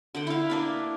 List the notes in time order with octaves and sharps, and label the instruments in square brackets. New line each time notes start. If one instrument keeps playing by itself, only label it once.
[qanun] D3 F#5 G5
E4 F5
A#3 D4 B4